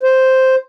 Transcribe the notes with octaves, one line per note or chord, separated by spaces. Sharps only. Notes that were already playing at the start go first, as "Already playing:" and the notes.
C5